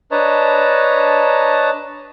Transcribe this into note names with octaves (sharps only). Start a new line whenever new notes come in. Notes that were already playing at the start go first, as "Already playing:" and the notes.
D4 B4 C#5 D#5 A5 A#5